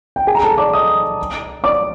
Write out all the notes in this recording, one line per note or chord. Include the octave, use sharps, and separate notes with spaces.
G5
G#4 G#5
A#5
A4 A5
D5 D6
D#5 D#6
D5 D6